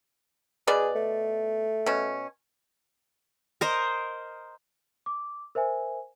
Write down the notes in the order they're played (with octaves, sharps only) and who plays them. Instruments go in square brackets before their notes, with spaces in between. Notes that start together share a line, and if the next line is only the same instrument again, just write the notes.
[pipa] B2 B3 D5 [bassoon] G#4
[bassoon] A3
[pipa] B2 C#4
[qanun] A#4 C5 D#5
[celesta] D6
A#4 C5 E5 G#5